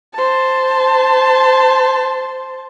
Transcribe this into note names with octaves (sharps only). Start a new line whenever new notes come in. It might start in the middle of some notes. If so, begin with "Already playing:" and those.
C5 A5